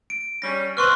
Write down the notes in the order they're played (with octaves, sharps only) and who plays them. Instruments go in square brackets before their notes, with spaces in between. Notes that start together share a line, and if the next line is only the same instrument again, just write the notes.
[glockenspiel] D7
[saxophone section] G3 C#4 [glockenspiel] A#6
[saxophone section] C4 B4 [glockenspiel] C6 C#6 F6